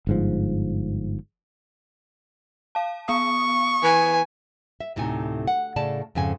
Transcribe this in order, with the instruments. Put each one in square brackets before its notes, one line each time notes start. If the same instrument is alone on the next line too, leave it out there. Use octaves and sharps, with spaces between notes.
[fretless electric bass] G1 G#2 F3
[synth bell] F5 A5
[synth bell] B3 F5 D#6 [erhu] C#6
[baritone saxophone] E3 [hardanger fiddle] G#5
[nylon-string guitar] E5
D2 A2 C3 D#4 G#5
F#5
A2 C#3 D5 A5
F2 G#2 C#3 G#5